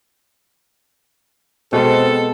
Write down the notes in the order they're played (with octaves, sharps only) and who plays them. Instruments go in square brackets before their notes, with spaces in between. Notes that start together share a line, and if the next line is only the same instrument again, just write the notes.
[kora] B2 G#3 [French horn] C4 [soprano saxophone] A4